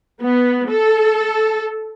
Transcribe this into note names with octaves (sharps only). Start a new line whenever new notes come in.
B3
A4